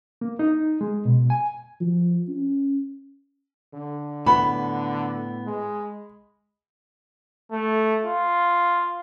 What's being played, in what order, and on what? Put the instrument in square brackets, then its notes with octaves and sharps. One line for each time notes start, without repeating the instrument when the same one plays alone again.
[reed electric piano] A#3
D#4
G#3
B2
G#5
[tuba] F3
C#4
[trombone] D3
[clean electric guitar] A2 B3 [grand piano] B5
[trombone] G#3
[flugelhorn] A3
F4